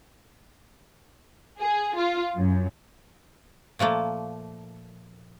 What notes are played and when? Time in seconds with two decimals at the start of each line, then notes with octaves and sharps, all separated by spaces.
1.59 G#4
1.96 F4
2.35 F#2
3.79 A#2 F3 A3 A#3